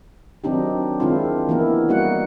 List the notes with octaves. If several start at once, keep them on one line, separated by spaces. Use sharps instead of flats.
D#3 F#3 C4 D4 D#4 G4
D#3 G#3 C4 D4 E4 F4
E3 A#3 B3 E4 A#4
G3 A3 A#3 D#4 F#4 F#5